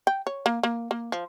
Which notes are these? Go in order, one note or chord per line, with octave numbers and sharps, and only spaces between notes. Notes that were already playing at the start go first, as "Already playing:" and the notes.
G5
C#5
A#3
A#3
A#3
F3